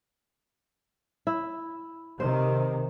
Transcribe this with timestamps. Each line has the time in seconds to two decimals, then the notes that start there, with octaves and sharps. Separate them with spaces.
1.27 E4
2.20 C3 D#3 C5